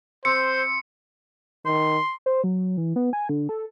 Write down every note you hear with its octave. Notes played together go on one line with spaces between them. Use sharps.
C4 C5 C#7
D#3 C6
C5
F#3
E3
B3
G#5
D3
A4